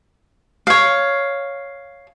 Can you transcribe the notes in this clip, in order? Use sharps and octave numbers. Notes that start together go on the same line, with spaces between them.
C#5 F5